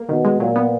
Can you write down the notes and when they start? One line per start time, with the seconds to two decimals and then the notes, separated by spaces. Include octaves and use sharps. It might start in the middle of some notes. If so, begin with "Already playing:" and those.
Already playing: A#3
0.09 B2 D#3
0.25 G#3
0.40 A#2 F#3
0.56 B3